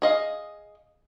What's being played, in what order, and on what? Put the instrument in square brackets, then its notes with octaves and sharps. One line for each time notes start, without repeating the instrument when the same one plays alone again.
[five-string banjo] G#4 D#5 F5